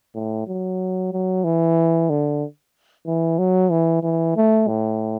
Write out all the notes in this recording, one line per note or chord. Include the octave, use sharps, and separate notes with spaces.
A2
F#3
F#3
E3
D3
E3
F#3
E3
E3
A3
A2